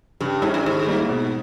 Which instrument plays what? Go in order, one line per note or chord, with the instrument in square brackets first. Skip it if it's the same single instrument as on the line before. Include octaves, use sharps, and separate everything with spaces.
[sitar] G2 [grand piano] C#3
[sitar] G#2 [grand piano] G3 C#4 E4
[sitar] G2
[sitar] G#2 [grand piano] D#3
[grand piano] G3 A#3 E4
B2